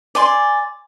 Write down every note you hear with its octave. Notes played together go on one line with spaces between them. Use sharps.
D5 G#5 C6